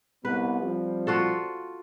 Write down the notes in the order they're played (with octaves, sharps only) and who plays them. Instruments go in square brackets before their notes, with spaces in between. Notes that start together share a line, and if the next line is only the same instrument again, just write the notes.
[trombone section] C2 B3 [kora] B4
[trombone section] F3 G3 C4
[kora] F4 F#4 A4